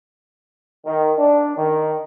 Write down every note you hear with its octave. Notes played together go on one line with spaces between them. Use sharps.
D#3
D4
D#3